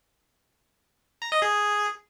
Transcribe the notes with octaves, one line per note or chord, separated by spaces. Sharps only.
A#5
D#5
G#4